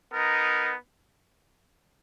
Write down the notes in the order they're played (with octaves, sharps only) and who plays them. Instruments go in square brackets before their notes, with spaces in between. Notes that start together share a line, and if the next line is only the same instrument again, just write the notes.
[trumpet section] B3 D#4 A#4